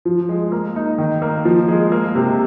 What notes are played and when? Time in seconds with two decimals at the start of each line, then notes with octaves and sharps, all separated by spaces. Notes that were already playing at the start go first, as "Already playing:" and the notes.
0.05 F3
0.29 G#3
0.52 A#3
0.76 D#4
0.98 D#3
1.22 A#3
1.45 F3
1.68 G#3
1.92 A#3
2.15 C3